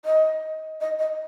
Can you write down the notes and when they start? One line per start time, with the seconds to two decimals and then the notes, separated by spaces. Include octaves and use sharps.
0.05 D#5
0.81 D#5
0.99 D#5